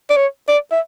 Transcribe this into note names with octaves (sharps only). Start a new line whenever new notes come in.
D5
C#5
D5
E5